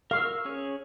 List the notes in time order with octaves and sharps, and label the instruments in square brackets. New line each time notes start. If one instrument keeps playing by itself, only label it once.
[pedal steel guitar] A#4 C#6 E6 [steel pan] F5
[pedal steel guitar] C#4 G#4 C#5